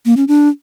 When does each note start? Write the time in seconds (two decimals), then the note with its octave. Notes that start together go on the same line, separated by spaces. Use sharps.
0.06 A#3
0.17 C#4
0.28 D4